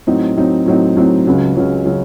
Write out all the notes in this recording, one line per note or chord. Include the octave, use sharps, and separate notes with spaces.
A2 F#3 C4 D#4
A2 F#3 C4 D#4
A2 F#3 C4 D#4
A2 F#3 C4 D#4
C#2 C#3 F#3 C#4
C#2 C#3 F#3 C#4
C#3 F#3 C#4